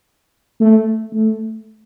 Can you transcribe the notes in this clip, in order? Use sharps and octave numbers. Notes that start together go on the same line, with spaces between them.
A3
A3